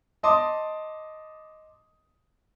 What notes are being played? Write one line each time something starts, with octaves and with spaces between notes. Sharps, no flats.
D#5 A5 C6 D6 D#6